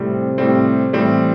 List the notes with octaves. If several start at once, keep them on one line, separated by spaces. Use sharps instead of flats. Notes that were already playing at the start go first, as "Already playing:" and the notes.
Already playing: A2 C3 G3 C4
A2 G3 C4
A2 E3 G3 C4